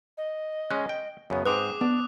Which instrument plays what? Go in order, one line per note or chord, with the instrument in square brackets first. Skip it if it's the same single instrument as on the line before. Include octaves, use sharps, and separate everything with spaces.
[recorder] D#5
[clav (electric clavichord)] G#3 C#4 [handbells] F#6
[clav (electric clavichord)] G5
[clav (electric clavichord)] F#2 C#3 B3 [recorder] C#5
[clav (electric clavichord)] G#2 C4 [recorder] G#4 [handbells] B4 [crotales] D6 D#6 F#6
[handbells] B3 [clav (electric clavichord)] D4